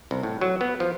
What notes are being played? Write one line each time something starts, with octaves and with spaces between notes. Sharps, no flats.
C2
A2
F#3
B3
F3